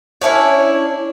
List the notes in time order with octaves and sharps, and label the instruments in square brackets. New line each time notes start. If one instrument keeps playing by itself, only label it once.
[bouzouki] C#4 D4 E4 C#5